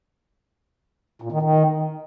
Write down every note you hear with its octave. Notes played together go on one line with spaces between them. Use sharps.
A#2
D#3
D#3